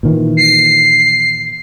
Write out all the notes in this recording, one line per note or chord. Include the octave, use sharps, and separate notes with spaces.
A#2 D#3 E3
C7